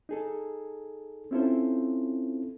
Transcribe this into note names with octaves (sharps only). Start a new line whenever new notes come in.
D#4 G#4 A4
C4 C#4 E4 F4 A4 C5